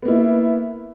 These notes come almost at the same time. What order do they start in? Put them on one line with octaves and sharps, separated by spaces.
B3 A#3 E4